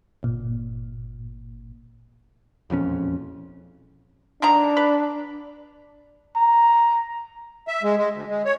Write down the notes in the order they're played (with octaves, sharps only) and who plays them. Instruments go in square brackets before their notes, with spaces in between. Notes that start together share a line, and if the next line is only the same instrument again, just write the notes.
[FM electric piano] G1 A#2
[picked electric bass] E1 A#1 F2 C#4
[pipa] D3 D#3 A#5 [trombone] D4
[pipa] B4
[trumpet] A#5
[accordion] E5
G#3
G#3
D2
G#3
C#5